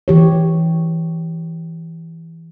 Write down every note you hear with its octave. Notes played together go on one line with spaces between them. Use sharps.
E3 G4 C#5